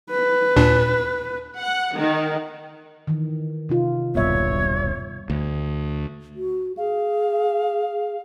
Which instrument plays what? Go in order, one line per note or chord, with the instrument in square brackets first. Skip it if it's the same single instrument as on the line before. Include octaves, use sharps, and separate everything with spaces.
[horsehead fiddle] B4
[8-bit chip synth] D#2 A#2 D4
[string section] F#5
D#3
[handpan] D#3 E3
C3 D#4 F4
[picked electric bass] D#1 B1 G2 [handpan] B3 E5 [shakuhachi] C#5
[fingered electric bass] D2
[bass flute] F#4
[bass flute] G#4 [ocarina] F5